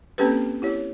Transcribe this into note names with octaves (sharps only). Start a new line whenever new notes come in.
A#3 C4 C#4 G4 A4 B4
E4 G4 C#5